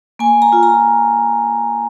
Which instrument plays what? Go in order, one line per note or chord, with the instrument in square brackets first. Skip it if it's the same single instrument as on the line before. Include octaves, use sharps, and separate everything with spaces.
[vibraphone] A#3 G#5
A#5
F4
A#5